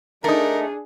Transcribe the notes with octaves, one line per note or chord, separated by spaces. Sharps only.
A3 D4 D#4 G#4 A#4